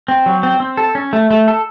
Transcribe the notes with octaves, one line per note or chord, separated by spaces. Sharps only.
C4
F#3
C4
C4
A4
C#4
A3
A3
A4